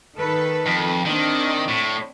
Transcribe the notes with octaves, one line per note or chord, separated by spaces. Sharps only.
D#3 A4 B4
F2
D#3 C4 D4
A2